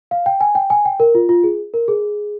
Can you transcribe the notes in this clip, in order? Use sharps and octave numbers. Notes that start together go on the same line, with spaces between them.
F5
G5
G#5
G5
G#5
G5
A#4
F4
F4
G#4
A#4
G#4